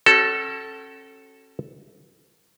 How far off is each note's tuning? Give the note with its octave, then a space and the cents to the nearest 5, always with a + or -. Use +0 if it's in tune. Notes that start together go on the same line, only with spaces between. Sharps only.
C#4 -35 F#4 +35 A4 +0